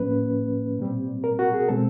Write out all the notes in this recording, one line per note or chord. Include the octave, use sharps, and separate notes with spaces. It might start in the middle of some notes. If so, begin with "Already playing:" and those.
Already playing: A2 F3 A#3 C#4 B4
A#2 G3 C4
A#4
F#4
G#4
B2 G#3 C4 A4